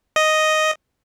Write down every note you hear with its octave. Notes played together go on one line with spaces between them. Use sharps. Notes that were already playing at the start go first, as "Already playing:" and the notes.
D#5